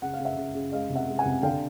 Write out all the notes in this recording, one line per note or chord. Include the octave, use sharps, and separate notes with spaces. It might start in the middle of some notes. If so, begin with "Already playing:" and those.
C#3 F#5
F5
C#3
E5 F#5
C#3
C#3
G#3 D#5 F5
C3
E5 F#5
G#3
F#5 G#5
C3
D3 F5 G5